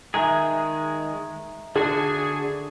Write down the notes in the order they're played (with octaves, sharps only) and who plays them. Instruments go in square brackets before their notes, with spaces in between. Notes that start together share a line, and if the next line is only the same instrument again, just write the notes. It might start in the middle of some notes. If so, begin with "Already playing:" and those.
[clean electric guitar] D#3 G#3 G#4 [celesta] E5 G#5 A#5
[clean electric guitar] D3 D4 F#4 [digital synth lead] G#4